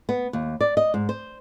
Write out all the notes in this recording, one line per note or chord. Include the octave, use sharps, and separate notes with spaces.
B3
D#2
D5
D#5
G#2
C5